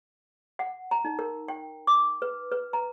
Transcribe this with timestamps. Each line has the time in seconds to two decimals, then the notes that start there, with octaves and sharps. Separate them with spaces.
0.59 F#5
0.91 A#5
1.05 D#4
1.19 A#4
1.48 G5
1.87 D6
2.22 B4
2.52 B4
2.73 A#5